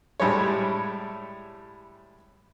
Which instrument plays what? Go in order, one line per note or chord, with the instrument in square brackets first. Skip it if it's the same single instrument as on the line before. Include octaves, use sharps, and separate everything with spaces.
[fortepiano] A2 G3 G#3 C#5